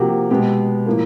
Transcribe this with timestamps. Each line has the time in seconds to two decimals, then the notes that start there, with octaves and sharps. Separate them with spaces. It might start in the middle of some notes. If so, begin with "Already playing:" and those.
Already playing: C3 F3 A#3 F#4 G4
0.31 B2 G#3 B3 G4
0.86 A2 F3 A#3